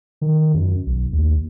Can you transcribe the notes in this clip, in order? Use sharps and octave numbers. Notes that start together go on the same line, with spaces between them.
D#3
F#2
B1
D#2